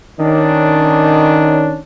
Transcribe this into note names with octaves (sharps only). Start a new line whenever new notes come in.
D#3 C#4 D4